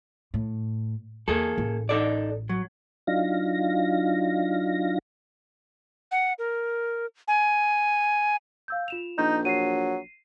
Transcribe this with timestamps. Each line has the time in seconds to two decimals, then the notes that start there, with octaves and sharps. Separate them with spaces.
0.34 A2
1.28 E2 A#3 G#4 A4
1.58 A1
1.89 D#4 A4 D5
2.49 F#3
3.07 F#3 D4 D#4 F4 F5 A#6
6.12 F#5
6.39 A#4
7.28 G#5
8.68 F5 E6 G6
8.88 F4 E7 F7
9.18 A#1 D#4 G6
9.45 F#3 C7 D#7